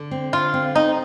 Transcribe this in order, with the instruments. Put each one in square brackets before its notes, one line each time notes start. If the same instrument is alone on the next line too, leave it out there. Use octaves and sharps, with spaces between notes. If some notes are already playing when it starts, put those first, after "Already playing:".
Already playing: [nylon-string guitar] D3
C4
[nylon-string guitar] D3 [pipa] F4
[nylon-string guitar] C4
[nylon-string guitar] C4 [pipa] D#4